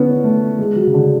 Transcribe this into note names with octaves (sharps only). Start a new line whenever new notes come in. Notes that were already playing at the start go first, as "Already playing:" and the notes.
Already playing: D3 E3 B3 C#4
A3
G#3
F#3
C#3
D3